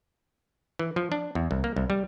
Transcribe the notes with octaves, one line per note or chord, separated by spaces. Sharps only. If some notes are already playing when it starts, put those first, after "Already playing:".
E3
F3
D4
E2
C2
A#3
C2
G3